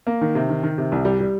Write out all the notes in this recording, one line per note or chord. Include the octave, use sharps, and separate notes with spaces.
A#3
D#3
C3
D#3
D#3
C3
C2
G3
G3